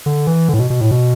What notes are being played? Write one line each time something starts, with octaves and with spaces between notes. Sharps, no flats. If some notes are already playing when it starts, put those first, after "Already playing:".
D3
E3
D3
A2
B2
B2
A2
B2